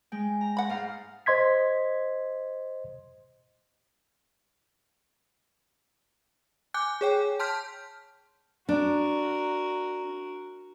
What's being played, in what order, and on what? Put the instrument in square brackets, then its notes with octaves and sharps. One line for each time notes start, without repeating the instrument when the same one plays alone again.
[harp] G#3 G5
A#5
[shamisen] F#5 B5
[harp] G#2 F5
[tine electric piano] C5 D#5 C6 G#6 B6
[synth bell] G#5 D6 F#6 G6
G#4 C#5 G5
A5 C6 F6 G6 B6
[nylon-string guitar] D4 [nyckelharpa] F#4 A#4